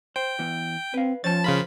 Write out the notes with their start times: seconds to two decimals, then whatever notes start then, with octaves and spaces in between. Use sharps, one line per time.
0.16 C5 G5
0.39 E3 B3
0.94 C4 B4 F5
1.24 F3 C#4 C5 C#5 A5 A6
1.44 C#3 F4 A#4 C5 B5